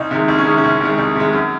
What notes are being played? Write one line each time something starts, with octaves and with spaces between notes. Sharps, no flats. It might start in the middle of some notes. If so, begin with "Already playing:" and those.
Already playing: C2 D#4
C3 D#3 G#3
C2 D#4
C#4
C3 D#3 G#3
C#4
C2
C3 D#3 G#3
C2 D#4
C3 D#3 G#3
F#2